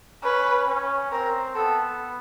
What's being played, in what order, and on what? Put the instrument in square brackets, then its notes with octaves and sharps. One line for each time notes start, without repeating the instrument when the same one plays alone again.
[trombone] C#4 [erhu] B4
[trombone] C#4
[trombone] C4 [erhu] A#4
[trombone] B3 [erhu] A4